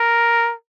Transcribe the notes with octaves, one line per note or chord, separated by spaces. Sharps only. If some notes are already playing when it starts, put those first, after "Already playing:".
Already playing: A#4